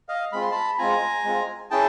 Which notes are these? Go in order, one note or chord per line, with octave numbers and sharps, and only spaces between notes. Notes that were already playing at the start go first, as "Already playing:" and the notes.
D#5 F5
G#3 C4 F4 B5
C6
A5 B5
G#3 C4 F4 G#5 A#5
G#3 C4 F4
C#4 E4 G#4 G5 A5